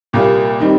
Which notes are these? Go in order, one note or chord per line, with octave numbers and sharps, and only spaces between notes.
C2 A#2 G3 A#3
D#3 G3 C4 D#4